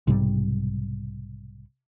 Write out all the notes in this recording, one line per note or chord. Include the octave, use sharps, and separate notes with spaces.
B1 G#2 C3 G3